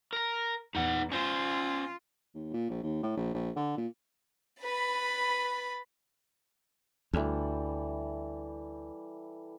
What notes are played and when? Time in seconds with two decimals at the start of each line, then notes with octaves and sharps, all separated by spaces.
0.13 A#4 A#5
0.75 E2 D#4 F#5
1.12 C#4 F4 C5
2.35 D#2
2.54 A#2
2.70 A#1
2.83 D#2
3.03 A2
3.17 A#1
3.34 A#1
3.56 D3
3.78 A#2
4.62 B4 B5 A6
7.13 D2 E3 G3 A4